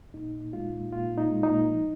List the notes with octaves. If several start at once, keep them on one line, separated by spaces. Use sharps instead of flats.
A#2 D#4
A#2
G#3 F4
A#2
A#2 F4
A#2
D#4
G#3
D#4
A#2
F3